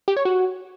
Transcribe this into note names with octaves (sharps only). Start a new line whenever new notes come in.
G4
C#5
F#4